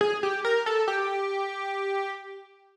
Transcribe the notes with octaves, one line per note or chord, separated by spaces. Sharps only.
G#4
G4
A#4
A4
G4